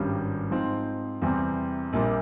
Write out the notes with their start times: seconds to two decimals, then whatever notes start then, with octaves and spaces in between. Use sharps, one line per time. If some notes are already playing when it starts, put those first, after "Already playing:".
Already playing: G#1 G2 G3 C#4 G4
0.51 G#2 F3 C4
1.22 E2 C3 G3 C4
1.93 A#1 A#2 G3